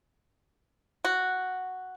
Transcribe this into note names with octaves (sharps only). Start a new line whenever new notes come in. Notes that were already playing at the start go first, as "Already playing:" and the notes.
F#4